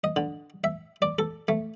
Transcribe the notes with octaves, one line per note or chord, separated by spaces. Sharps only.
D#5
D3
E5
D5
A4
A3